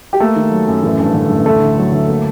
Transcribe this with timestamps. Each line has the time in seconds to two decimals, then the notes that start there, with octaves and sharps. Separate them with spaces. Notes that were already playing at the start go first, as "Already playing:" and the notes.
0.13 G4
0.20 A3 A#3 A4
0.36 D#3
0.52 F#3
0.68 F#2
0.83 A1
0.99 G2
1.14 D3
1.30 A1
1.46 D2 A3 A4
1.61 D3
1.78 F#3
1.92 D2
2.09 A#3